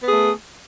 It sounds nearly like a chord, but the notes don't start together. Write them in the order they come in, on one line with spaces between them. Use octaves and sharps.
B3 G#4 A3